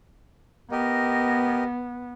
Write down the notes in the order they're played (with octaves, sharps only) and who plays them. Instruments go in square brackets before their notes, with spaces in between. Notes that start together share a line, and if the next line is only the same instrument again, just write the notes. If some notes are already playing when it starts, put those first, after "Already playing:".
[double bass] B3 [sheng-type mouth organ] G4 A#4 D#5